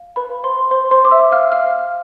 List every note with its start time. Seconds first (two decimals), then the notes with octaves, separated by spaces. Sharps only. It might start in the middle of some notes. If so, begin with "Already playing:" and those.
Already playing: F5
0.16 B4 B5
0.30 F5
0.43 C5 C6
0.71 B4 C5 C6
0.91 C5 C6
1.05 D6
1.11 B4 E5 E6
1.32 F5 F6
1.52 C5 F5 F6